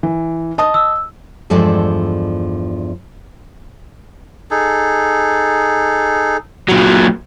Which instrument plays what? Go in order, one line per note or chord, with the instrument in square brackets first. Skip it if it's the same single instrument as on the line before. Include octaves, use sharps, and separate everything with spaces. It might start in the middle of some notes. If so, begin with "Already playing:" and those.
[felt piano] E3
D#5 A5 D#6
[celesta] E6
[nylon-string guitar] E2 G2 F3 G#3 A4 D5
[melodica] D#4 G#4 A4
[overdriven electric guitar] A#2 F#3